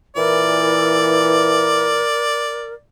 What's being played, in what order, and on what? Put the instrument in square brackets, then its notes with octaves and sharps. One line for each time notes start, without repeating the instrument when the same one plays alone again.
[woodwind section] A#2 E3 [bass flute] A#4 [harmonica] D5